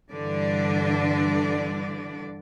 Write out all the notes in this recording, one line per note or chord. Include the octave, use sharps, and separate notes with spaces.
G2 D3 E3 D4 D5